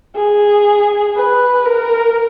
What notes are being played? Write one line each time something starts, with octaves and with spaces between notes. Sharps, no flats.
G#4
B4
A#4